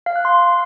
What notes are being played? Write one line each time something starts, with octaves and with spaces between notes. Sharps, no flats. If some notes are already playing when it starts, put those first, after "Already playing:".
F5
F#6
C6